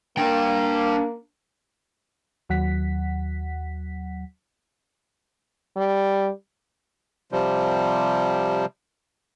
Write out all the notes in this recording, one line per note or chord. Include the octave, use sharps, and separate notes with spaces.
A#3 D4 G5
D#2 F#3 F#5 B6
G3
C3 F3 G3